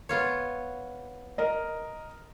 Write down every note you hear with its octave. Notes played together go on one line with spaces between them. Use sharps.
B3 F4 C#5
A#4 D#5